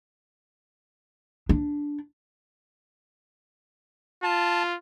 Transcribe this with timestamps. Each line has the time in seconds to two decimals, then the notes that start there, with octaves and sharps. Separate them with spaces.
1.49 D4
4.23 F4 A5